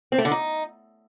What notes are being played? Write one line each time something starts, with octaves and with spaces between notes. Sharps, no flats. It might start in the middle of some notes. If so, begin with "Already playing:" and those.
C4
A3
D3
D#4